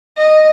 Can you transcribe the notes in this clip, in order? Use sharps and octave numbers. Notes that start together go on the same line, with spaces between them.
D#5